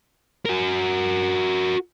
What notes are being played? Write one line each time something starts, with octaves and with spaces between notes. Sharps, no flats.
F#4 A#4